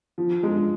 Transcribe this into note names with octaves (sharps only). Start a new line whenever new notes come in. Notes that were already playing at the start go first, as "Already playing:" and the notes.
F3
G#3